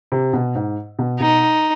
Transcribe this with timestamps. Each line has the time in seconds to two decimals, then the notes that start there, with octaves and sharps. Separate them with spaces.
0.12 C3
0.33 B2
0.55 G#2
0.99 B2
1.20 B2 D#4